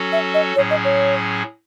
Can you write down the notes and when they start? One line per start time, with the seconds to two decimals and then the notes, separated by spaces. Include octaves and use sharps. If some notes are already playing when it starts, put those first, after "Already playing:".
Already playing: F#3 C#4 F#4 A4
0.12 E5
0.34 D#5
0.56 A2 F#3 C#4 G#4 C#5
0.70 D#5
0.84 C#5